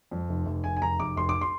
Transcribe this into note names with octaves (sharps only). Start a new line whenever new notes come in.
F2
F1
F1
F1 G#5
G#5
F1 A#5
F1 D6
F1 C6
D6
C6